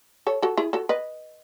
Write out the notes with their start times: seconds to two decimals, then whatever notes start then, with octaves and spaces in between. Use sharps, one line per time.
0.27 A4 C#5
0.42 F#4 A4
0.57 E4 G#4
0.73 F#4 A4
0.89 B4 D#5